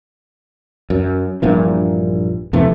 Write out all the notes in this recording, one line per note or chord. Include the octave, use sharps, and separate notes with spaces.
F#2
A#1 G2 A#2 E3
F2 C3 E3 A3